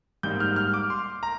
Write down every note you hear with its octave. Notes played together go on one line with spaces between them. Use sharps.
G#2 G3 A#3 D#4 G6
F6
F6
D6
C6
A#5